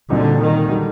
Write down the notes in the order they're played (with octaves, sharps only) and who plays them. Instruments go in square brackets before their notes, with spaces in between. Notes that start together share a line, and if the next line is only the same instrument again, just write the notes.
[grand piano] A#2 G3 C4 D#4 F#4 [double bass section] D3
[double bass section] D#3
[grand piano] D3 G3 D4 F#4